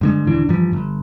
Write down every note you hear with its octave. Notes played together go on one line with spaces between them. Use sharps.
G2 D3 G#3
D#1 D3 E3 D4
G2 E3 F3
G1